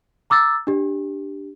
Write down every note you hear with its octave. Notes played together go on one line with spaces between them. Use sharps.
A#5 D6 E6 A6
D4 G4